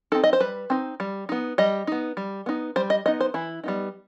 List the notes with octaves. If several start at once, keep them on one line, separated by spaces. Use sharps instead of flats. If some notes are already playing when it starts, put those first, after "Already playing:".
C4 D#4 A4
D#5
C5
G3 B4
C4 D#4
G3
B3 D#4
G3 D#5
B3 D#4
G3
B3 D#4
G3 C5
D#5
B3 D#4 D#5
C5
E3 E4
G3 B3 D#4